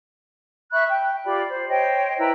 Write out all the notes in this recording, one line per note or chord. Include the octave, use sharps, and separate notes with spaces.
E5 B5 C#6 F#6
G5
F4 G4 D5 B5
C5
C5 C#5 D#5 G5
E4 B4 G5 A#5